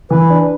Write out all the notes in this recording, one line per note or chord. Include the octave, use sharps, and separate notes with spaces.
E3 B4
D4